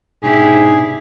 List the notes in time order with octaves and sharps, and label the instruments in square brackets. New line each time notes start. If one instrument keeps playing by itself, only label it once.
[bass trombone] G#2 [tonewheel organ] B2 D4 [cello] E4 G4 [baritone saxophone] G#4